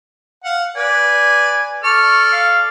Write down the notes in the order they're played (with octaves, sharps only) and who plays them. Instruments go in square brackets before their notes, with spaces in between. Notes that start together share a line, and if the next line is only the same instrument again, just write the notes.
[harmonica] F5 F#5
[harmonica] B4 D5 [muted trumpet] G#5
[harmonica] A4 F6 [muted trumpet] D5 [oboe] C#6
[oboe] F5